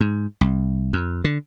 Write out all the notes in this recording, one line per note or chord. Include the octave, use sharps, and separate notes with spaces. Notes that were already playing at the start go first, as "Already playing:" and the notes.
G#2
C2
F2
D3